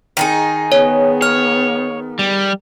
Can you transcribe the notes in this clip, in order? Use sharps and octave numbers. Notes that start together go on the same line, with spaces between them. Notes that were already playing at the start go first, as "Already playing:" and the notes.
D#3 D#4 G#4
B3 C#5
C#5 F6
G3